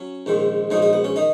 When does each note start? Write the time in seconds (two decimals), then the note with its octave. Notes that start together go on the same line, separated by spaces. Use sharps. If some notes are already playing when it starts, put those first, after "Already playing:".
Already playing: F#3 C#4
0.26 A#1 G#2 D#3
0.71 A#1 G#2 F#3 D#4
0.82 D#4
0.93 B3
1.04 C#4
1.16 D#3 D#4